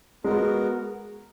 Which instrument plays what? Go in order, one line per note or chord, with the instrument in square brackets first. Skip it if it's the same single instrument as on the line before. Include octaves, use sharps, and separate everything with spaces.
[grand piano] G#3 [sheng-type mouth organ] B3 F#4 A#4